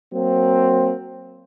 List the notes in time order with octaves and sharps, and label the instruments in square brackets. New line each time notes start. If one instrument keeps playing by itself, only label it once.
[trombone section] F#3 A#3 C4